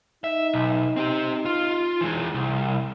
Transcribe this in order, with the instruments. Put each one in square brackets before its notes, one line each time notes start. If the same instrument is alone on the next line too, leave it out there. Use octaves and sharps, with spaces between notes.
[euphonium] D#4 [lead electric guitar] E5
[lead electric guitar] B1
C4 G4
F4
E3 G#3
C2